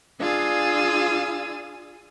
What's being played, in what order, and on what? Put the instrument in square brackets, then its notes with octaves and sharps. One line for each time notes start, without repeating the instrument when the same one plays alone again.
[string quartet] D4 F4 G#4 F5 D#6 E6